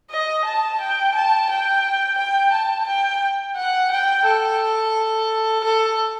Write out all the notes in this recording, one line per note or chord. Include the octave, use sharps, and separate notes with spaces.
D#5
A5
G5
A5
G5
G5
A5
G5
F#5
G5
A4
A4